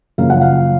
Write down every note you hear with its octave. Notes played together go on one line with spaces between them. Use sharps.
F#2 C#3 F3 A#3 F5
F#5
F5